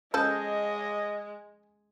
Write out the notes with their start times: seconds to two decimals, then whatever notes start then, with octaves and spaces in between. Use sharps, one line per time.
0.14 F3 G#3 C#4 A4 D#5 A5 D#6 G6